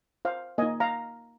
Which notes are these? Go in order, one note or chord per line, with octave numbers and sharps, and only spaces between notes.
C5 F5
A#3 D#4 D#5 G#5
F5 A#5